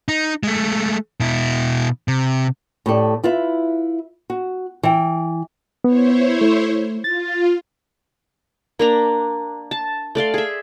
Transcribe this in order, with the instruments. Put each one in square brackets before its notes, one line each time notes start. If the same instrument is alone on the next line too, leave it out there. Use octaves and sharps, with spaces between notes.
[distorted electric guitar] D#4
G#3 A3
B2 E4
C3
[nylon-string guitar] A2 G4 A4 D5
E4 F4 B4 E5
F#4
E3 G5
[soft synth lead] B3 [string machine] E4 C5 C#5
[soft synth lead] A3
[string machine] F4 [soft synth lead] A6
[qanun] A#3 D4 A#5
A5
A3 D5 F5 C6
G#4 E5